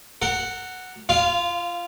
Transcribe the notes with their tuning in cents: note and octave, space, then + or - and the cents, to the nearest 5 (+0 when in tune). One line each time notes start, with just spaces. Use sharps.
A#4 -35 F#5 +0
F4 -25 F5 +0